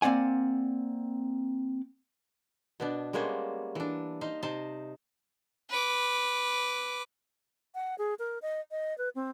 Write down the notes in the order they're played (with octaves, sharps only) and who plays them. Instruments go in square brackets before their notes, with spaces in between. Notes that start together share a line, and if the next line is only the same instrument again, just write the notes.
[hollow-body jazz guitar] A#3 C4 D5 F#5 G#5
[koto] B2 B3 D4
G3 G#3 A#3 B3 C#4 C5
E3 D4
D#4 C5 F5
C3 D#4 C5 A5
[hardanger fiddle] B4 D6
[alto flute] F#5
G#4
A#4
D#5
D#5
B4
C4